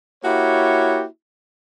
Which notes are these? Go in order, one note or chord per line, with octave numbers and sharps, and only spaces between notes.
A#3 E4 F#4 G4 C#5